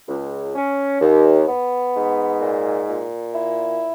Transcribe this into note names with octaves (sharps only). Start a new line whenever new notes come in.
C#2
C#4
D#2
B3
G#2
A#2
A#2
E4